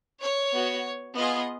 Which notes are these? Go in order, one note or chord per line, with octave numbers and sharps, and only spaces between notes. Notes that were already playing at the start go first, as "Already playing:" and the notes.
C#5
B3 F#4
B3 F4 G#4 D#5